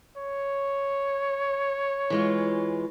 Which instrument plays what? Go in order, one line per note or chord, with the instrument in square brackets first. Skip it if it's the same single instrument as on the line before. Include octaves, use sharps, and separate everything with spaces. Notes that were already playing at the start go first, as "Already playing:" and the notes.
[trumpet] C#5
[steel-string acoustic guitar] E3 G#3 F4